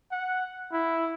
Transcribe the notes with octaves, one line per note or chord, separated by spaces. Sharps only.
F#5
E4